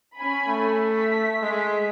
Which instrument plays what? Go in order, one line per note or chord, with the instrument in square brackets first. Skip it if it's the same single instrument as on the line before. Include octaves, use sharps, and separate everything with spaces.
[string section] C#4 G#5 B5
[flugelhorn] A3
[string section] B6
[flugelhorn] G#3